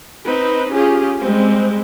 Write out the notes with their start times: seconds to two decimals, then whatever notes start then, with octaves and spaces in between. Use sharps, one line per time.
0.24 C4 D#4 B4
0.71 C#4 F4 G4 G#4
1.21 G3 G#3 C4